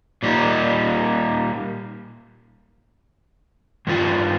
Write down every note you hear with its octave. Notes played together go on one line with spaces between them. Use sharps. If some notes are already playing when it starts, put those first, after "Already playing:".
A#2 G3 A#3 D#4
G2 D#3 F4